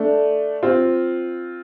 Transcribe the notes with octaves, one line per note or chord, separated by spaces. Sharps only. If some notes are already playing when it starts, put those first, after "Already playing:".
Already playing: A3 D4
C4 F4